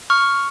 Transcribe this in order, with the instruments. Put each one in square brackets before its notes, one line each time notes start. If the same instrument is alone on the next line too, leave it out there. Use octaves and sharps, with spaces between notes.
[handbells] C#6 F6